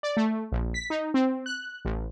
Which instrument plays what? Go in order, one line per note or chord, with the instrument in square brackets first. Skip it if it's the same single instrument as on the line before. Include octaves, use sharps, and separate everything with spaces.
[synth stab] D5
A3
A#1
B6
D#4
C4
F#6
A1